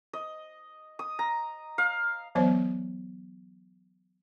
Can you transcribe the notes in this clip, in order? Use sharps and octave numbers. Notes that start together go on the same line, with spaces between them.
D#5
D#6
A#5
F5
E3 F#3 B3 C5 C#5